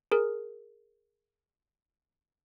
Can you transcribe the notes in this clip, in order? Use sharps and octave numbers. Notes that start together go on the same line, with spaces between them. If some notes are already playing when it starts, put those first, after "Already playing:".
G#4 A#4